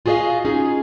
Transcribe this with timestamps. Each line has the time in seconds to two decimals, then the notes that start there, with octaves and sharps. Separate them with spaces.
0.06 F4 F#4 G#4 C5 D#5 F5
0.45 C#4 D#4 F4 G#4